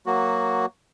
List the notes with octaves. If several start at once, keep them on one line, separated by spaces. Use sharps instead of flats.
F#3 A#3 F#4